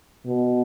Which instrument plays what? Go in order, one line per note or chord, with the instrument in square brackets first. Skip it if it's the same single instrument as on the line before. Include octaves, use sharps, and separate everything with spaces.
[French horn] B2